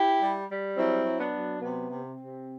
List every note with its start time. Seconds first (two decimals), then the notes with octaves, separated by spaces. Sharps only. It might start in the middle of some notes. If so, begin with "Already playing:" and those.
Already playing: E4 G4
0.20 G3
0.48 G3
0.76 F#3 C4 E4
1.04 F#3
1.19 B3 D4
1.33 F#3
1.61 C3 B3
1.90 C3
2.03 C4
2.18 C3